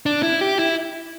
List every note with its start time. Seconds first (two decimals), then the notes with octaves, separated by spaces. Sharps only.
0.06 D4
0.23 E4
0.41 G4
0.58 E4